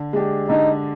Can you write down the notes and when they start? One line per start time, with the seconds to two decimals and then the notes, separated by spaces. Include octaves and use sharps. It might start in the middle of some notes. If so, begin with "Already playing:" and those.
Already playing: D3
0.13 G#3 D4 G4
0.49 D3 D#4